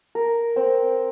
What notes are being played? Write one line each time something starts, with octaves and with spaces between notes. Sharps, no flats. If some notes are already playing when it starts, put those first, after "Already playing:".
A#4
C4